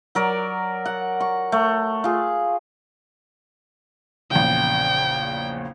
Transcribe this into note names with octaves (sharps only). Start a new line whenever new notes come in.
F#3 A#4 D5
F#5
C#6
A3
F4 G#4
A#1 E2 C#3 G5